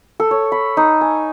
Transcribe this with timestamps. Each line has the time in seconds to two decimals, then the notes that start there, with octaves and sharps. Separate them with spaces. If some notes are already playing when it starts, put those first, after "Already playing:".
0.20 A4
0.31 C#5
0.52 B5
0.77 D#4
1.01 G#5